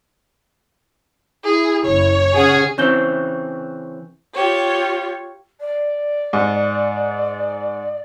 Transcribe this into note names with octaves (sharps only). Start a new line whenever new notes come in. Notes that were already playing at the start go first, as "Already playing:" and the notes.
E4 G#4
F#1 C#5
C#3 C#4 G#4 F#5
C#3 E3 C4 C#6 G6 G7
F4 G4 C#5
D5
G#2